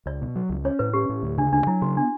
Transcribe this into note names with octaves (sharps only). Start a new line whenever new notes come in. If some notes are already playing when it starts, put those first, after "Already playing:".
C#2 D5
B2
F#3
C#2
C#4 C#5
A2 B4
C#4 G4
A2
D2
C#3 D4
D2 D4
F#3 E4
C#3 F#4
B3 D4